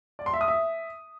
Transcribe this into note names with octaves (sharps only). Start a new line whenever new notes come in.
D5
C6
E5
D#6
E5